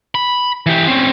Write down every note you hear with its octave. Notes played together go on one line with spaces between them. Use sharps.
B5
E3 G4
C4 C#4